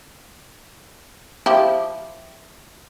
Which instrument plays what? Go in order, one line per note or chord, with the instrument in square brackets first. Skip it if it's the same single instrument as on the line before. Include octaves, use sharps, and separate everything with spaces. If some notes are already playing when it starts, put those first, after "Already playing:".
[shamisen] F3 E4 G4